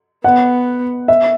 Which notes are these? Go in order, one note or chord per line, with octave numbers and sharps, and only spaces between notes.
B3 F#5
E5